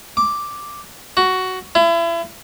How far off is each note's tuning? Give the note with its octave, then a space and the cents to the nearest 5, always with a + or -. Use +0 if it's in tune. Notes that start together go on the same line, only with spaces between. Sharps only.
D6 +0
F#4 +10
E4 +35